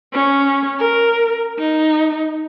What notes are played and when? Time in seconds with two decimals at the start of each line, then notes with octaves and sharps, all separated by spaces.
0.13 C#4
0.79 A#4
1.59 D#4